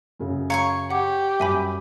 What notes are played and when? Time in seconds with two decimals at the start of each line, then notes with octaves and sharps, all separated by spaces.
0.19 F#2 C#3
0.50 C#5 F5 G#5 A#5 C#6
0.91 G4 F#5 D6
1.40 F#2 G3 E5 G#5 B5 B6